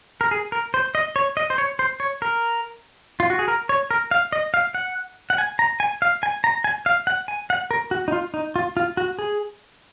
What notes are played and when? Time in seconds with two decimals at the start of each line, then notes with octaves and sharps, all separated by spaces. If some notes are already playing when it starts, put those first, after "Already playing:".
0.21 A#4
0.31 G#4
0.52 A#4
0.74 C5
0.95 D#5
1.16 C#5
1.37 D#5
1.50 C5
1.58 C#5
1.79 C5
2.00 C#5
2.22 A#4
3.20 F4
3.30 F#4
3.39 G#4
3.48 A#4
3.69 C#5
3.91 A#4
4.11 F5
4.33 D#5
4.54 F5
4.75 F#5
5.30 F#5
5.38 G#5
5.59 A#5
5.80 G#5
6.02 F5
6.23 G#5
6.44 A#5
6.64 G#5
6.86 F5
7.07 F#5
7.28 G#5
7.50 F#5
7.71 A#4
7.91 F#4
8.08 D#4
8.12 F4
8.34 D#4
8.56 F4
8.77 F4
8.97 F#4
9.19 G#4